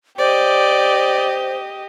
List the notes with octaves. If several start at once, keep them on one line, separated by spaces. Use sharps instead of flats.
G4 C5 D5 D#5